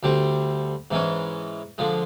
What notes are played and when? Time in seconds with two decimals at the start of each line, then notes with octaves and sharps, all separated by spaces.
0.03 D2 D3 G3 C4
0.91 G#2 E3 G#3 C#4
1.78 D3 F3 G#3